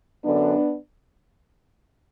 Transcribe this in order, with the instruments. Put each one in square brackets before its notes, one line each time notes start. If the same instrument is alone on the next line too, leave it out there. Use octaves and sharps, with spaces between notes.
[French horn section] F#2 D3 B3 D4